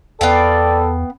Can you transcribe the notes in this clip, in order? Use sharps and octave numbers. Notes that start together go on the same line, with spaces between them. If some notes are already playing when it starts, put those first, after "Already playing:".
E2 B3 A4 D5 F5 G5